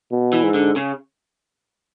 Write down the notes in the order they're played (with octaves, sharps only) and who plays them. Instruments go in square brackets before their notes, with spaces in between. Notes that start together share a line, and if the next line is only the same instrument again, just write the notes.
[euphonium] B2
[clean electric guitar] E3
[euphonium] G#2
[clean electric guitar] D3
C#3